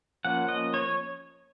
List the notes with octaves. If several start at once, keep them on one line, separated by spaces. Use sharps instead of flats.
F3 A#3 C#4 F#5
D#5
C#5